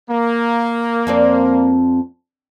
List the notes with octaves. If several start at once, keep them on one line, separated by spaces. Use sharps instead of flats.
A#3
F2 C4 D5